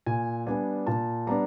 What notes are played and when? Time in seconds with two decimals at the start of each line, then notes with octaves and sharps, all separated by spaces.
0.06 A#2 G#5
0.46 G3 B3 D4 G#5
0.87 A#2 A5
1.27 G3 B3 D4 A#5